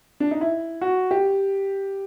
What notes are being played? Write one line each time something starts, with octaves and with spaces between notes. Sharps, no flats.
D4
D#4
E4
F#4
G4